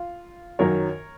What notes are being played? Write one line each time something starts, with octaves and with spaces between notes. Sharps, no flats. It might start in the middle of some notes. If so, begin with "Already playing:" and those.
Already playing: F4
F#2 D#3 F#3 A#4 C#5